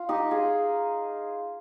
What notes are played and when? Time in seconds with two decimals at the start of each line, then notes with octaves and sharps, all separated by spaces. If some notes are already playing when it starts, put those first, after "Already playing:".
Already playing: F4
0.09 D#4 G4
0.31 F4 G#4